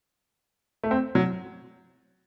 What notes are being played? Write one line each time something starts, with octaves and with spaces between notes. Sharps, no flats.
A3
C4
F#3